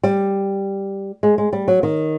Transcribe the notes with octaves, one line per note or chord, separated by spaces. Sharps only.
G3
G#3
G#3
G3
F#3
D#3